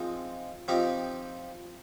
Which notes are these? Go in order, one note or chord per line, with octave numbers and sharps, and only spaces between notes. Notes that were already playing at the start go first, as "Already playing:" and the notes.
Already playing: F3 G#3 C4 D#4
F3 C4 D#4 G4